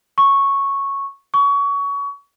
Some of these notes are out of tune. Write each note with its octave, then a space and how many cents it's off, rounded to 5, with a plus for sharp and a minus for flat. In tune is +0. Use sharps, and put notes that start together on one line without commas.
C#6 -5
C#6 +25